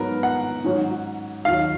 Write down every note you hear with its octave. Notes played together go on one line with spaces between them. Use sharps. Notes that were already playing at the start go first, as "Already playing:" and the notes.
Already playing: G#2 F#3 B3 A#4
F#5
G#2 D#3 F#3 C#4
D#2 D#3 F#3 F5